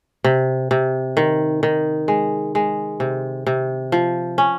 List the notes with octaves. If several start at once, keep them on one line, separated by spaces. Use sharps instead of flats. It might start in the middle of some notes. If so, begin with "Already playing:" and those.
C3
C3
D#3
D#3
G#3
G#3
C3
C3
F3
C#4